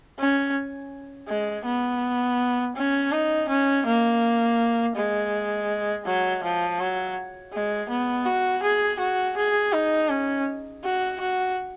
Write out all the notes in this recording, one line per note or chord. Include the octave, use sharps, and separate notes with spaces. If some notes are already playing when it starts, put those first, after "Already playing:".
C#4
G#3
B3
C#4
D#4
C#4
A#3
G#3
F#3
F3
F#3
G#3
B3
F#4
G#4
F#4
G#4
D#4
C#4
F#4
F#4